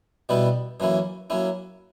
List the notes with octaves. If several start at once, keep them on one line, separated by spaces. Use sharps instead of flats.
B2 G3 B3 E4 B4
F#2 E3 A#3 C#4 E4
F#3 A#3 C#4 E4